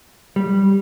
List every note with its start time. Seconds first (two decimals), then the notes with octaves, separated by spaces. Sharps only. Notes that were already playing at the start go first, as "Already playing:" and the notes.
0.36 G3